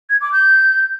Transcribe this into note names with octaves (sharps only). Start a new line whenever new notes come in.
G#6
D6
G6